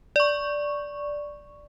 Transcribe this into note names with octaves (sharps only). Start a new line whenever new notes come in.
D5 C#6